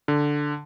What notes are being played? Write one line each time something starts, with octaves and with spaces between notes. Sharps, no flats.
D3